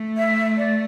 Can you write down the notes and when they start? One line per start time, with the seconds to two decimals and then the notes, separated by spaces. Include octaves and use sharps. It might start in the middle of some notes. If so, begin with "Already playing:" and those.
Already playing: A3
0.17 E5
0.57 D5